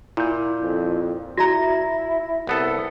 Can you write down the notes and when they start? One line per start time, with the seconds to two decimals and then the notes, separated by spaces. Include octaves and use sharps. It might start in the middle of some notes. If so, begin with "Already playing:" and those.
0.17 A#2 E4 G6
0.62 F2
1.38 E4 F#4 D5 A#5 A#6
2.47 C2 B3 A4